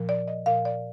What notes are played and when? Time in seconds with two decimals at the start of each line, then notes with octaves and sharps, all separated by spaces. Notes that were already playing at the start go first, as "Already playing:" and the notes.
Already playing: A#2 F3
0.09 D5
0.28 D#5
0.46 A#2 F3 F5
0.65 D5